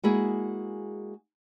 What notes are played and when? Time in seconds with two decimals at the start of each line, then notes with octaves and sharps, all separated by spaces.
0.04 G#3 A#3 E4 F#4 G#4 E5